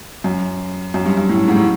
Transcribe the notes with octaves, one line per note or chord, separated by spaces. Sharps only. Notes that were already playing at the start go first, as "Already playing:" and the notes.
F#2
F#2
G2
G2
A2
G#2
A2